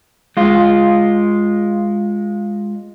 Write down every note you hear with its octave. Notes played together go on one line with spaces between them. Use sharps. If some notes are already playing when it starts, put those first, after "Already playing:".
G#3 F4